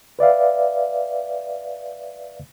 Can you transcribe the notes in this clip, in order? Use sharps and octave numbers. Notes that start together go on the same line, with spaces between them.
B4 D5 E5 F5